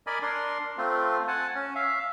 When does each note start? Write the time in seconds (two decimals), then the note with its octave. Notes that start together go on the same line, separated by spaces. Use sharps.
0.07 A#4 D5 D#5 G#5 B5
0.22 D4 A#4 C6
0.78 A3 C4 F4
1.28 F#5 G#5 A5
1.55 C#4
1.75 E5 F5